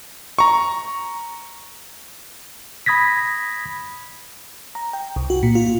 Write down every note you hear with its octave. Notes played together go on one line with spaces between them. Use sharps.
A#5 C#6
B5 D#6 G#6 A#6 B6
A#5
G5
C2
F#4
A#2
F4